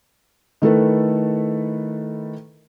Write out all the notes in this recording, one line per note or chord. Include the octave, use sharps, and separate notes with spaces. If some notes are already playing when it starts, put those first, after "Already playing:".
D#3 A3 E4 A4 B4